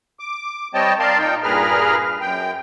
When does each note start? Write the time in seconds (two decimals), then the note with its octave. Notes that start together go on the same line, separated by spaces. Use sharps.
0.20 D6
0.74 G3 C4 C#5 D#5 G5 A5
0.99 A#4 D5 F5 A5 C6
1.18 A#2 D#4 G5
1.43 G2 A#2 G#4 A#4 B4 F6
2.21 F#2 G5